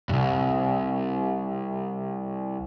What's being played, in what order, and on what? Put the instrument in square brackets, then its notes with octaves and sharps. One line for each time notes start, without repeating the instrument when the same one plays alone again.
[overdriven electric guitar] C2 G2